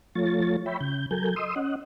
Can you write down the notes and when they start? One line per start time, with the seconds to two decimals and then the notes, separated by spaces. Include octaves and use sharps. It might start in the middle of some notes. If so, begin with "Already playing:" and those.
0.15 F3 A3 F4 C#5 A6
0.66 C#5 E5 G5 B5
0.80 C#3 G6
1.11 F#3 A4 A#4 G#5 G6
1.36 D#5 C6 D#6 E6
1.56 C#4 D#5 F#5